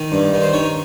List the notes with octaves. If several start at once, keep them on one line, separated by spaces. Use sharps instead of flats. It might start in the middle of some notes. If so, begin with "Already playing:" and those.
Already playing: D#3
G2
D#3
C5
D#3 C#5